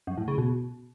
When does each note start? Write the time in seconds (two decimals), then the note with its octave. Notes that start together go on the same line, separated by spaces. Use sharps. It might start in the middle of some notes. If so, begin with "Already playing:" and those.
0.07 F#2
0.18 A2
0.28 C#3
0.38 B2